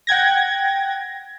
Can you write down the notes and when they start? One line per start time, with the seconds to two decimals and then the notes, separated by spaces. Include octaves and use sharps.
0.07 F#5 G5 G#6 A#6